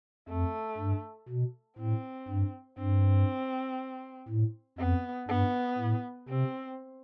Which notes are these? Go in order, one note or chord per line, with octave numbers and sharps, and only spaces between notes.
F2 A3
G2
B2
A2 C4
G2
G2 C4
A2
F2 B3
G2 B3
A2
C3 C4